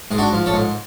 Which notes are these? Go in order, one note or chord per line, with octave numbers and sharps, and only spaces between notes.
G#2 G#4
D4 F#4
F3
A4 C#5
G#2